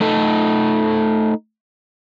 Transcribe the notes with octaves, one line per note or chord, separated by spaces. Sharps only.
A3 D#4 A4